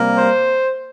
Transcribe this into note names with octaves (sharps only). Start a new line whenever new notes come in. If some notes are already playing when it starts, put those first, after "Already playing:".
Already playing: C3 G3 A#3
C5